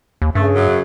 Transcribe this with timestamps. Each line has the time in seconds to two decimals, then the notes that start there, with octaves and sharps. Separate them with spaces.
0.22 D#2
0.35 G2 C#3 A3
0.55 F#2